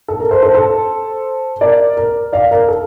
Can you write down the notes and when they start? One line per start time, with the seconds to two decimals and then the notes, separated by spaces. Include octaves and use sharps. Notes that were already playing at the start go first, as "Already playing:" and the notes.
0.08 A4
0.20 A#4
0.31 A4 C5
0.43 A4 C5
0.55 A4 C5
1.61 A#4 D5
1.97 A#4
2.33 D5 F5
2.51 A#4
2.68 A4